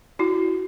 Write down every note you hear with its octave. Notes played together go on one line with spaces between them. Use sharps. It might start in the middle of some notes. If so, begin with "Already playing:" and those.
E4 F#4